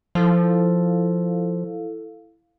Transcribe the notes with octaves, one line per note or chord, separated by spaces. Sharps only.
F3 E4 A4 F5